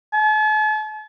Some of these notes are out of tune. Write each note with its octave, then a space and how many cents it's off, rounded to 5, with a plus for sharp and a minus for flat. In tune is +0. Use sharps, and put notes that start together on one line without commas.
A5 -45